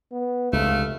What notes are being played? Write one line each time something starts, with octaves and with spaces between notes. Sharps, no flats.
B3
F1 C#2 A3 F5